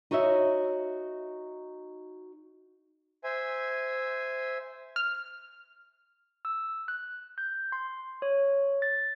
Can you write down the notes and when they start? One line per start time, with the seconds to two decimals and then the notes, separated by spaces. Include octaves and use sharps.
0.11 D#4 F#4 C#5 D#5 E5
3.24 C5 E5 G#5
4.96 F6
6.45 E6
6.88 F#6
7.38 G6
7.72 C6
8.22 C#5
8.82 A6